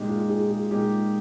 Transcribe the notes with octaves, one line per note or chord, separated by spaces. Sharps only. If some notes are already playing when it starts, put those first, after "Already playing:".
Already playing: A#2 G#3 D#4 G4
F4 G#4
F4 G#4
F4 G#4
A#2 G#3 D#4 F4 G4 G#4